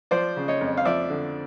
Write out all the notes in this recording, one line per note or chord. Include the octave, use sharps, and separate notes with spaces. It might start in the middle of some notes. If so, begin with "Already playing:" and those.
F3 C5 D5
C#3
C#5 D#5
F2
F5
F3 D5 E5
D3